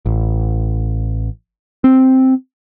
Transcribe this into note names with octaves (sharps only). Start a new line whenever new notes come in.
A1
C4